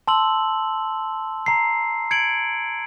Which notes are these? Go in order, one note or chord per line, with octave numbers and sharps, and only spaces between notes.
A5 C6 E6 F#7
A#5 C7
G#6 C#7 D7 F#7